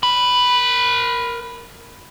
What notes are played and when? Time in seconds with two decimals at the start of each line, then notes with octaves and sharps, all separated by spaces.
0.03 A#4 B5